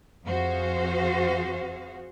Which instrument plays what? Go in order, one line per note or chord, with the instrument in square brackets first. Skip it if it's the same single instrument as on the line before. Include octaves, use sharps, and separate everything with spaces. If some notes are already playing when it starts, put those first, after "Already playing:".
[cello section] F2 F#4 G#4 C5 F5